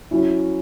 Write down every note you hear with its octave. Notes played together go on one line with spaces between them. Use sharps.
F#3 C#4 E4